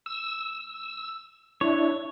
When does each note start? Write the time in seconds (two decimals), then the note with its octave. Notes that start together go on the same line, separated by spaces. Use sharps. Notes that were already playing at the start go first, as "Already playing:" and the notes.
0.06 E6
1.61 D4 E4 C#5